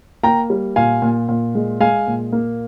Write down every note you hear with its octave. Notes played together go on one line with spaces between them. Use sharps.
A#3 G5 A#5
G3
A#2 F5 G#5
A#2
A#2
G#3
G#3 F5 G#5
A#2
A#3